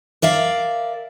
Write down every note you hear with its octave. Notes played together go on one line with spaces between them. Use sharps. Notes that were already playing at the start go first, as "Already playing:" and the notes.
A#4 D5 E5 F5